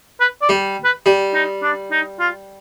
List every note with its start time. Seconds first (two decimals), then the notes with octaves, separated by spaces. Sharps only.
0.20 B4
0.42 D5
0.49 G3
0.85 B4
1.06 G3
1.34 D#4
1.62 D4
1.92 D#4
2.20 F4